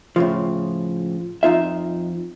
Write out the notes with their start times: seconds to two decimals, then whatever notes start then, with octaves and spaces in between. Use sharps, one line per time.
0.16 A2 C#3 F3
1.43 F2 D#4 F4 E5